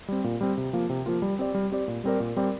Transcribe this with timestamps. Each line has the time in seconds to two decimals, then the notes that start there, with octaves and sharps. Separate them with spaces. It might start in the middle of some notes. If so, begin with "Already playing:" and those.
0.08 G3 C4
0.24 A#2
0.41 G3 C4
0.57 C3
0.73 F3 A#3 F4
0.90 C3
1.06 F3 A#3 F4
1.22 G3
1.39 C4 G4 D5
1.55 G3
1.72 C4 G4 D5
1.88 A#2
2.04 G3 C4 A#4 D5
2.20 A#2
2.37 G3 C4 A#4 D5